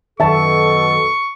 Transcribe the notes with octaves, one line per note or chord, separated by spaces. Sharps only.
F#2 B2 D#3 A4 E5 A5 C#6